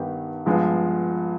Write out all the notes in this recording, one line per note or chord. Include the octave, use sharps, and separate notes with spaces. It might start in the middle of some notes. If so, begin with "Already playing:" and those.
Already playing: G2 D#3 B3 D#4 G4
G2 F3 G#3 B3